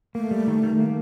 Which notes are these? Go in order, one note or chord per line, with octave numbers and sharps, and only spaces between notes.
A3 A#3
G3
D#3
D#3
A#3